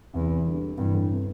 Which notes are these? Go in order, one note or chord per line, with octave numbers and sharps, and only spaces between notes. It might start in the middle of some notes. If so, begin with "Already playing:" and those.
E2 C3 E3
D3 G3
G2 C3 E3
A2 D3
C3